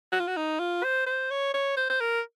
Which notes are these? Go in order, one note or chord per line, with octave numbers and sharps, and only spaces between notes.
F#4
F4
F#4
D#4
F4
C5
C5
C#5
C#5
C5
C5
A#4